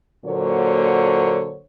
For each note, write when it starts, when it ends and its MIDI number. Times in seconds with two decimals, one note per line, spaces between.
0.25 1.59 46
0.25 1.59 50
0.25 1.59 54
0.25 1.59 58
0.25 1.59 72
0.25 1.59 73